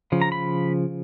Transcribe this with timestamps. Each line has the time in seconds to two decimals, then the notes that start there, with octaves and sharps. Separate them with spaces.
0.12 C#3 F3
0.22 A#5
0.32 B5